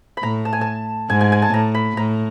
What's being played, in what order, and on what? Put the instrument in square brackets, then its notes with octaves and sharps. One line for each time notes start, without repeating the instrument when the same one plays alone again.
[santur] B5
[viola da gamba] A2 [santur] A#5
[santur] A5
G#5
A5
[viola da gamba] G#2 [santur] G#5
[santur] G#5
G#5
A5
[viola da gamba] A2 [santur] A#5
[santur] B5
[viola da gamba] A2 [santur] A#5